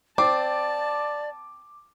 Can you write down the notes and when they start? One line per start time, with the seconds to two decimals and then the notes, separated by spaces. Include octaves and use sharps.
0.18 C4 D5 A5 D6